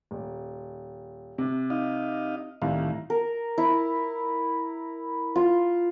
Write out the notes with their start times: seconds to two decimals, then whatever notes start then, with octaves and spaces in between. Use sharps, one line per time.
0.11 D#1
1.38 C3
1.70 D#4 D#5 F5
2.62 C2 A2 D#3 E4 F5
3.10 A#4
3.58 E4
5.36 F4